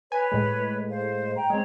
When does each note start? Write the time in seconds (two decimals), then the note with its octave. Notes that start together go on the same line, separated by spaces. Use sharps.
0.12 B4 C#5 G#5
0.32 A2 G#3
0.89 C5 F5
1.36 G5 A#5
1.50 G#3 C4 C#5